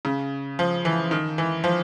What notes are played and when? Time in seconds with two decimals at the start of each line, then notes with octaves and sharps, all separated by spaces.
0.05 C#3
0.59 F3
0.85 E3
1.11 D#3
1.38 E3
1.64 F3